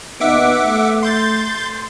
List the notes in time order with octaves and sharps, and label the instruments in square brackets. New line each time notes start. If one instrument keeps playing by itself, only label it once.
[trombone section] D#2 B3 D#4 [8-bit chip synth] E5 F#5 D6
[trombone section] A3
[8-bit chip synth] C6 G6 A6